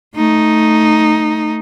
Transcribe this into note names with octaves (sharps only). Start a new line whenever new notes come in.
A3 D#4